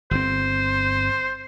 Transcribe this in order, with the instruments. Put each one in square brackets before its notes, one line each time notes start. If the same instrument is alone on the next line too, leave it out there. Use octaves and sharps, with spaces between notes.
[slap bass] G1 C4 [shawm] C5